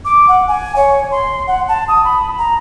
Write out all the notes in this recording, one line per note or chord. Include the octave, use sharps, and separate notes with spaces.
D6
F#5
G#5
C#5
C6
F#5
A5
D#6
B5
A#5